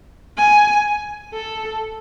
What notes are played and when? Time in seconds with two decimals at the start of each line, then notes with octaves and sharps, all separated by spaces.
0.37 G#5
1.34 A4